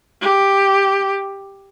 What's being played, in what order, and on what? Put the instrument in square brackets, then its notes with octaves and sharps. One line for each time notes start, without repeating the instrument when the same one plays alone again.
[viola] G4